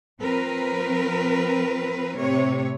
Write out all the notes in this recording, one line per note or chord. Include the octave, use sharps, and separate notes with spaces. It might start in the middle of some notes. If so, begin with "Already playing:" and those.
F3 C4 A#4 B4
A2 C3 C#5